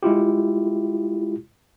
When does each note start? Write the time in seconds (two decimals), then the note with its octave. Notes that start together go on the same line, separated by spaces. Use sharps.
0.03 G#3 E4 F4 G4